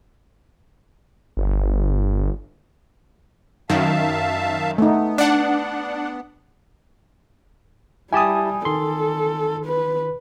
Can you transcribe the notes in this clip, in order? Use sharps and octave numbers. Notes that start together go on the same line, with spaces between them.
G1
F#2 D#3 E5 F5 A5
A3 B3 D#4
D4 F#5
G3 E4 G4 G#5 A5 D#6
D#3 A4 C6
B4